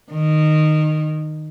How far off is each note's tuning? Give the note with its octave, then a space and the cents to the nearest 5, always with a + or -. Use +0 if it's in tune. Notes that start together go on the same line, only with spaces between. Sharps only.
D#3 -15